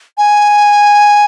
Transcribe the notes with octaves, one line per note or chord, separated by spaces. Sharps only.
G#5